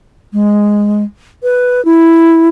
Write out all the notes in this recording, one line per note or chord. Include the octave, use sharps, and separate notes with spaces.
G#3
B4
E4